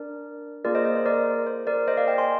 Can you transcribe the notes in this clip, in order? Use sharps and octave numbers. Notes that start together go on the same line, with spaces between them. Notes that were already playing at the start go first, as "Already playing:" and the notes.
Already playing: D4 A#4 D5
A#3 F4 G#4 A#4 D5
C5 D#5
C5 D#5
C5
A#4 D5
C5
A#4 D5
C5 D#5
D5 F5
D#5 G5
G#5 C6